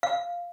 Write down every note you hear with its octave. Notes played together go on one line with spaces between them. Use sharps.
F5